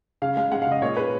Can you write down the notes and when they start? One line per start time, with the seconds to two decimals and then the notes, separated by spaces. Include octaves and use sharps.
0.22 C#3 F5
0.37 G#3 F5
0.52 G#3 F#5
0.62 F5
0.67 C#3 D#5
0.82 A#2 C#5
0.97 G#3 B4